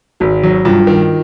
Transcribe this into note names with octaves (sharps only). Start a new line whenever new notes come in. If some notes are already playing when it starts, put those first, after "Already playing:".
G#1 F#4
F#3
G2 F4
D#3